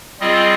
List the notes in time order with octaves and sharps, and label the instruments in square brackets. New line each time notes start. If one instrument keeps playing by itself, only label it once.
[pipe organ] G3 C4 F4 G#4 D#5